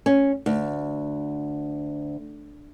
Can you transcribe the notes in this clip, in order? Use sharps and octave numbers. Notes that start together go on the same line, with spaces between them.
C#4
D2